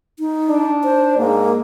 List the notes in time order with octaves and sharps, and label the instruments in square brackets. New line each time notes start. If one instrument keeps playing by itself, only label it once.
[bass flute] D#4
[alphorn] D4
[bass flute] C5
[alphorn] G#2 [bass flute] A#3